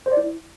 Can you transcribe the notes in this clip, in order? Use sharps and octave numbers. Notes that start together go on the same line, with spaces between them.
C5
D5
E4